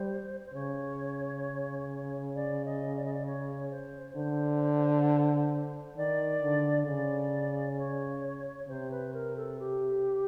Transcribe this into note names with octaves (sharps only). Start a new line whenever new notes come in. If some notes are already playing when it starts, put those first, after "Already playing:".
Already playing: G3 C5
C5
C#3 C#5
D5
D#5
D5
D#5
D5
C#5
C5
D3 C5
D#3 D5
D3
C#3 D5
C#5
C3 C5
B4
A#4
A4
G4